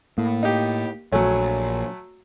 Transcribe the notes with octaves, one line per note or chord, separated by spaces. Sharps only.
A2 A#3
D#4 G4
A#1 F#3 A3 C#5 G#5